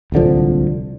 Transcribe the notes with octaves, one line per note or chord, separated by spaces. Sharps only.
D1 C2 D3 F3